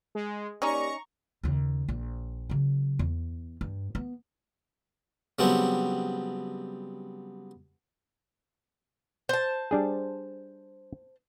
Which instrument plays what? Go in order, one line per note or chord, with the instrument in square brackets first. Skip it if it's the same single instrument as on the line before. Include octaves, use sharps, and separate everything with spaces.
[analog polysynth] G#3
[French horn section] A#3 G4 D5 [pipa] C#4 D#4 [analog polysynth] A#5 C#6
[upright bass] D#2 C#3
A#1
C#3 F#3
E2
G2
B3
[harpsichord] C#3 F#3 G3 B3 C4 D4
[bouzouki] C5 A5
[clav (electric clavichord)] G3 D4 G#4